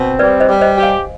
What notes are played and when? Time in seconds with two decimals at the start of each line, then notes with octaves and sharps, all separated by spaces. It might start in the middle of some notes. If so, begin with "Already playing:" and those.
Already playing: B2 C4
0.19 G3 B4 D5
0.40 C5 D#5
0.48 G3
0.61 C5 D#5
0.76 G4
0.83 F5 G#5